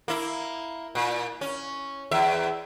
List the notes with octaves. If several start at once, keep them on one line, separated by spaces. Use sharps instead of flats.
A#3 E4
A#2
C#4
E2 E5